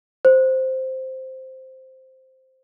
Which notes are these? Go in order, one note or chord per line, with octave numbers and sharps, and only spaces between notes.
C5